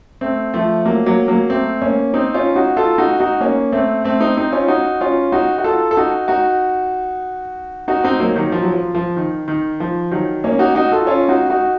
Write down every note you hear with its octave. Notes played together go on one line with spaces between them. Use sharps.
A3 C4
F3 A3
F#3 A#3
F#3 A#3
F#3 A#3
A3 C4
A#3 C#4
C4 D#4
C#4 F4
D#4 F#4
F4 A4
D#4 F#4
D#4 F#4
A#3 C#4
A3 C4
A3 C4
C4 D#4
C4 D#4
C#4 F4
D#4 F#4
C#4 F4
D#4 F#4
F#4
F4 A4
A4
D#4 F#4
D#4 F#4
D#4 F#4
C4 D#4
F#3 A#3
D#3 F#3
F3
F#3
F3
F3
D#3
D#3
F3
D#3 F#3
A#3 C#4
D#4 F#4
D#4 F#4
F4 A4
C#4 F4
D#4 F#4
D#4 F#4